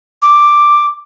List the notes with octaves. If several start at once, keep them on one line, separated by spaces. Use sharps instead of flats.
D6